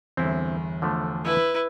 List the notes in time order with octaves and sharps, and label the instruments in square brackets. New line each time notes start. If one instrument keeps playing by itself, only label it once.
[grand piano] G1 E2 [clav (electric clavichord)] C4 E4
[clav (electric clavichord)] D3 F3 A3
[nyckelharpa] E4 B4